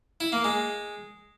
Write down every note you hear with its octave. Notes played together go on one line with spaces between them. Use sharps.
E4
A#3
G#3